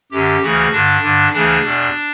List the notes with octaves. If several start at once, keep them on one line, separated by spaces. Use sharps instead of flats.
F#2 D3 G4
D2 C#3 E3 F#4
G2 D3 D4
G2 D3
D2 C#3 E3 D4
E2 B2